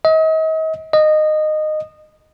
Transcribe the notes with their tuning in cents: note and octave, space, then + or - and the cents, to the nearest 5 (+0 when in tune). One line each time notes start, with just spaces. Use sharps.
D#5 +40
D#5 -15